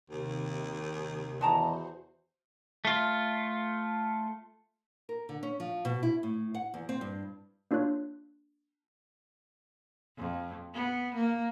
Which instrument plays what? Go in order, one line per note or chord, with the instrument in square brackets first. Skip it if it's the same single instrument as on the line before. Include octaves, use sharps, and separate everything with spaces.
[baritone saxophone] D#2 [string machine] C3 D#3
[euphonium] E2 [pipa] G#3 A5 A#5 [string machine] F#4 C5
[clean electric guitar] A3 F4
[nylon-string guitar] A#4
D3
C#4
F3
B2
E4
A2
F#5
E2
C4
G2
[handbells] A#3 D4 F4 C#5 F#6
[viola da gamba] F2
B3
A#3